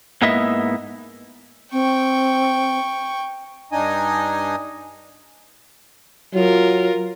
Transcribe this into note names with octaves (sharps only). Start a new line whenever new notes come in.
G#2 A#3 B3 E4 D#5 E5
C4 G5 C#6
G2 D4 D#4 D#5 G#5 D#6
F#3 F4 A#4